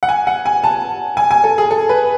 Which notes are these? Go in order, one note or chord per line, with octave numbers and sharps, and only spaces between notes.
F#5
G#5
F#5
G#5
A5
G#5
G#5
A4
G#4
A4
B4